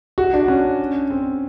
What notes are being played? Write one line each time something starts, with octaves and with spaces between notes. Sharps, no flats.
F#4
D4
C#4
C4